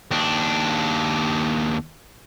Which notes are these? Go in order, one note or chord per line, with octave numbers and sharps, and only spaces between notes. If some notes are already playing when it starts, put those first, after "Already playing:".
D#2 D4